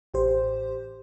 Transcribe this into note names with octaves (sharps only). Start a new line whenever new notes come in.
A1 G4 C5